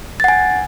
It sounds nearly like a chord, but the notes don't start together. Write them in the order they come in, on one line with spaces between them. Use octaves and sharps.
A6 F#5 G#5